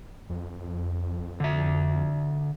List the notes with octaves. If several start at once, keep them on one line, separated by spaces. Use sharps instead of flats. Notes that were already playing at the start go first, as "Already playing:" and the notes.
F2
D3 E5